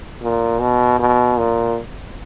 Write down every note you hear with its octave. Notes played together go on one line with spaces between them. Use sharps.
A#2
B2
B2
A#2